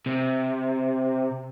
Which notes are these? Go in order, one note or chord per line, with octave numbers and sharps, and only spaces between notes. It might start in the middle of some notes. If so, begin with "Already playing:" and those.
C3